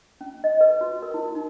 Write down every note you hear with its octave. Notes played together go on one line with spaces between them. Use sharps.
C#4
D#5
B4
F#4
A#4
E4
D#4